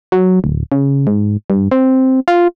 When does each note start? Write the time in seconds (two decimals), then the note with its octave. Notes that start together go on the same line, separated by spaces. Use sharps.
0.12 F#3
0.44 D1
0.72 C#3
1.07 G#2
1.50 G2
1.71 C4
2.28 F4